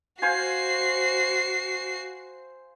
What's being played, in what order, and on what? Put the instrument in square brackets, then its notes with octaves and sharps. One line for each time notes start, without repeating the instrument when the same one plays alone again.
[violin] F#4 C7 [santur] C5 F5 G#5